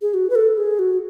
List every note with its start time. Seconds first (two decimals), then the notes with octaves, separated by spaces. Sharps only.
0.02 G#4
0.14 F#4
0.30 B4
0.35 A4
0.58 G#4
0.79 F#4